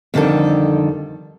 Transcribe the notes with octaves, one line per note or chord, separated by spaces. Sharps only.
F2 D3 D#3 G3 A4